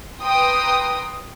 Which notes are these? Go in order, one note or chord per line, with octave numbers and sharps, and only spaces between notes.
B4 G5 A#5 C6 D#6